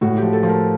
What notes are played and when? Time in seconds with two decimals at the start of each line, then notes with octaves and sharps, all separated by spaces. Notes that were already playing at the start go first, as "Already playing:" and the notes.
0.01 A2 F#4
0.17 G4
0.22 F3
0.33 A4
0.43 F3
0.49 A#4